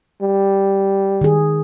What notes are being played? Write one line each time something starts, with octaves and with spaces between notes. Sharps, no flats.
G3
D#3 G#4